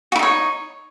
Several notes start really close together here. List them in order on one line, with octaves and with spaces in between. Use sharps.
F#4 E4 D#4 C#5